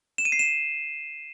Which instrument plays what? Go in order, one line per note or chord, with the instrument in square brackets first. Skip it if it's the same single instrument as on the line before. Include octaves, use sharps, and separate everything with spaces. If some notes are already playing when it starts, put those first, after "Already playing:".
[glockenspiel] E7
D#7
C7
E7